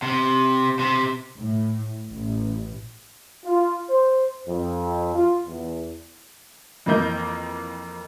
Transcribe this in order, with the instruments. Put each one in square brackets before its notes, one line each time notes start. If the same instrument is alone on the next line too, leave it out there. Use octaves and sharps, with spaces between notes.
[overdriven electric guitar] C3
C3
[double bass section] A2
A1
[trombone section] F4
C5
F2
F4
E2
[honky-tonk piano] F2 E3 A#3 D#5 G6